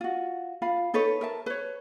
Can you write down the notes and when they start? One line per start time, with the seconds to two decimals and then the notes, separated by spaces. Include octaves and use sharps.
0.01 F4 F#4
0.62 F4 F5 B5
0.94 D#4 A4 B4 C#5
1.21 A#4 E5 A5
1.46 B4 C#5